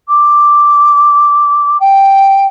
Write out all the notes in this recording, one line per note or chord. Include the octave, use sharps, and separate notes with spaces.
D6
G5